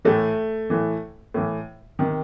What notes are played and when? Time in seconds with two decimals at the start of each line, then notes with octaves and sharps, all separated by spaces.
0.05 A2 E3 A3
0.70 A2 E3
1.34 A2 E3
1.99 C3 D#3